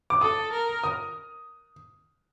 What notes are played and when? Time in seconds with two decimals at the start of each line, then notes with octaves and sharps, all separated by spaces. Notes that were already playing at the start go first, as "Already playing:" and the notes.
0.10 D6
0.21 A4 D#6
0.52 A#4
0.84 D#6